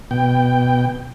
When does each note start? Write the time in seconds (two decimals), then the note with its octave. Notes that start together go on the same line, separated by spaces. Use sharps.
0.11 B2 G5